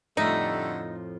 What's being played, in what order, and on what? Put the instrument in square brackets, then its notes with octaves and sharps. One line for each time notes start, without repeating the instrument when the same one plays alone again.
[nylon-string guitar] F2 A2 F3 [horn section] D3 G3 A3 [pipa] D#4